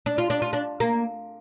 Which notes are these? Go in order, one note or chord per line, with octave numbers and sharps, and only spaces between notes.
D4
F4
D4
F4
D4
A#3